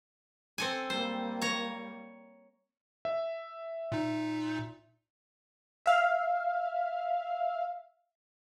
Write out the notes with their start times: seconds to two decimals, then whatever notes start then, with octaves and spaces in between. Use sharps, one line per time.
0.58 C4 A4 G#5
0.90 G3 A#3 C5
1.42 C#5 A#5
3.05 E5
3.92 A#2 D#4
5.86 E5 F5